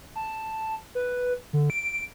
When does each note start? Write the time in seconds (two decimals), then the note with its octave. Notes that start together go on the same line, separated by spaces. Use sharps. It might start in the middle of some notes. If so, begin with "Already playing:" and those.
0.16 A5
0.95 B4
1.53 D3
1.70 D7